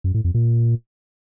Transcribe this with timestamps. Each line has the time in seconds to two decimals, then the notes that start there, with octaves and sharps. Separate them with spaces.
0.04 F#2
0.14 A2
0.24 F2
0.34 A#2